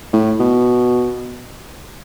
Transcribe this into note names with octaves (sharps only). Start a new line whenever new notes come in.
A2
B2